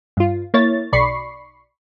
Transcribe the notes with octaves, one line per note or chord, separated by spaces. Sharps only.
G2 F4
A#3 E4 C#5 A6
B1 D5 B5 C#6 C7